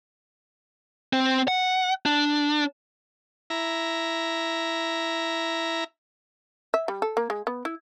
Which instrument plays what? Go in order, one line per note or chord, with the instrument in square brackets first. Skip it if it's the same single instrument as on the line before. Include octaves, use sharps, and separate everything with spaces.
[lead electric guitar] C4
F#5
D4
[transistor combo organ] E4 A#5
[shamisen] E5
G3
A4
A#3
G#3
B3
E4